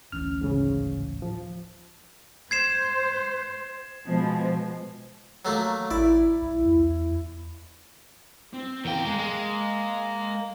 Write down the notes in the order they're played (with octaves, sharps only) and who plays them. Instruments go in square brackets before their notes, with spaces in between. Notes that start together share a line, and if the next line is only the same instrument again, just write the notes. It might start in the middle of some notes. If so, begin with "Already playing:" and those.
[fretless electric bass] D1 A1 C#4 [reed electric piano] F6
[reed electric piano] G#2 C#3
F3
[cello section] C5 [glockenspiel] G#6 C7 E7
[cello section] B2 F3 G#3
[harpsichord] F#3 A3 A#3
[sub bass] A1 [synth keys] E4 [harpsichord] D5
[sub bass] B1
E2
[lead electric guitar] C4
[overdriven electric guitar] E2 G5 [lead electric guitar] A#4 F5
[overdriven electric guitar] G#3
G#3